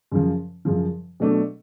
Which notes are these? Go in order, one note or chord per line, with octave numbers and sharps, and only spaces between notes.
F#2 C#3 F3
F#2 C#3 F3
B2 F#3 A3 D4